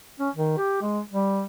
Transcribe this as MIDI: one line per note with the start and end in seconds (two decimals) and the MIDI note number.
0.20 0.29 61
0.35 0.54 51
0.57 0.77 67
0.82 1.00 56
1.11 1.45 55